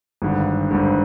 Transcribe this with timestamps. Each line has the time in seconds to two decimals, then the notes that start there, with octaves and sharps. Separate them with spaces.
0.22 G#1 G2 D3
0.71 G#1 G2 D3